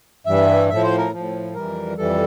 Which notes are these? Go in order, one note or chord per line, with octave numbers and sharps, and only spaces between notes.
G2 E3 G3 E5
A2 F3 E5
C5
A#4
A2 F3
F2 E3 G3 A#4
F2 E3 G3 A4